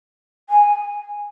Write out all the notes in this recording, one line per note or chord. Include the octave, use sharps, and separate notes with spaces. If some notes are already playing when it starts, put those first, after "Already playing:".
G#5